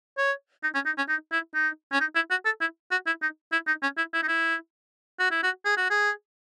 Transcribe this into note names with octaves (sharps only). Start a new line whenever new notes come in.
C#5
D#4
C#4
D#4
C#4
D#4
E4
D#4
C#4
D#4
E4
F#4
A4
E4
F#4
E4
D#4
E4
D#4
C#4
E4
E4
D#4
E4
F#4
E4
F#4
G#4
F#4
G#4